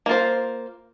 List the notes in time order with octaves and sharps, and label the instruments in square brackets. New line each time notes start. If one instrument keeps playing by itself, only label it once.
[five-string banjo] A#3 F4 C5